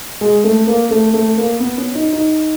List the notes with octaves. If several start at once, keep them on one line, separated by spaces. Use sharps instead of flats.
G#3
A3
A#3
A3
A3
A#3
B3
C#4
D#4
D#4